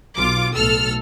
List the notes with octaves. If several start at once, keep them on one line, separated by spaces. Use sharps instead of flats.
B1 F4 D6
B1 A2 A4 E6 F6